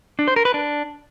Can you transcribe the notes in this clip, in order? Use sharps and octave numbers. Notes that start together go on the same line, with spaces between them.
D4
C5
A#4
B4
D4